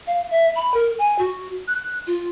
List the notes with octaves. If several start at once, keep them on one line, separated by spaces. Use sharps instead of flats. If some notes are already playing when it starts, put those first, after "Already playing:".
F5
E5
B5
A#4
G#5
F#4
F#6
F4